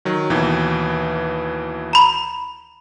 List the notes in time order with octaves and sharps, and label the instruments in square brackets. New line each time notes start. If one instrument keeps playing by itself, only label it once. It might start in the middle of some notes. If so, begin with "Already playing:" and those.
[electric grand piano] D#3 F#3
D#2 B2 E3
[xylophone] A#5 B5